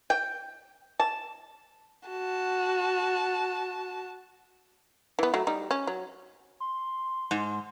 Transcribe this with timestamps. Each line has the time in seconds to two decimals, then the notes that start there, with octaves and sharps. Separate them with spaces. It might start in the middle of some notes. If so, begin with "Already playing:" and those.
0.10 G5
0.99 A5
2.09 F#4 A5
5.19 E3 B3
5.34 F#3 A3
5.47 G3 D#4
5.71 C#4
5.87 F#3
6.60 C6
7.31 G#2